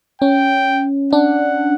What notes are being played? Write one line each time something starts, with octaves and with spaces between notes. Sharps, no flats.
C#4 G5
D4 F#5